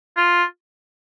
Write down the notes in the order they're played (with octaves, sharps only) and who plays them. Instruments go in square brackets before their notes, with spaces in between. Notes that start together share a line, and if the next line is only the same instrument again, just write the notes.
[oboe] F4